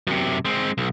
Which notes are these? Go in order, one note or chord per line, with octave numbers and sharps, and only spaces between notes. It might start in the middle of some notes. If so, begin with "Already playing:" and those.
F#2 C3
G#3 C4
B1